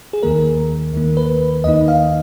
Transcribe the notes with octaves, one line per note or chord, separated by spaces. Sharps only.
G#4
D#2 D#3 A#3 A#4
D#2 D#3 A#3
B4
D#2 D#3 A#3 D#4 D#5
F5